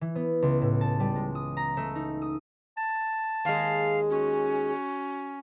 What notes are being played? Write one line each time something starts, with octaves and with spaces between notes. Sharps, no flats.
E3
B3
C#2
A2
A5
G3
G#3
D#6
A#5
A3
D#4
D#6
A5
D#2 G#3 F5
C#4 F#4